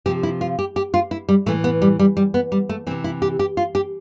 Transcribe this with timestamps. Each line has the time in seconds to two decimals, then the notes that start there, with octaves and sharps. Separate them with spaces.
0.06 C3 F3 G4
0.23 E4
0.41 F4
0.59 G4
0.76 G4
0.94 F4
1.11 E4
1.29 G3
1.46 A2 E3 A3
1.64 B3
1.82 G3
1.99 G3
2.17 G3
2.34 B3
2.52 G3
2.69 A3
2.87 E3 C4
2.91 C3
3.04 E4
3.22 G4
3.39 G4
3.57 F4
3.75 G4